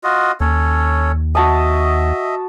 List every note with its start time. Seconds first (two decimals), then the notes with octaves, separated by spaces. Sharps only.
0.04 F4 F#4 D#5
0.40 D#2 C#4 A4 C#5
1.35 F#4 D#5 E5 A5 D#6